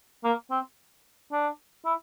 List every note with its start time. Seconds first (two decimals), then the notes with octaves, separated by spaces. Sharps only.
0.24 A#3
0.51 C4
1.32 D4
1.85 E4